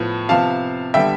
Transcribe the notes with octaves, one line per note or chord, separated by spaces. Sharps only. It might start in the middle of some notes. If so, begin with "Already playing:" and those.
Already playing: A2 F3 B3
C3 F3 B3 F5 A5
D3 G3 B3 E5 G5